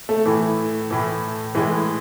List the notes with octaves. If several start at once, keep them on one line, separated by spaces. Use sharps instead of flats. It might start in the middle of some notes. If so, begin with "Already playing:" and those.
A3
A2 E3
A2 E3
A2 E3 G#3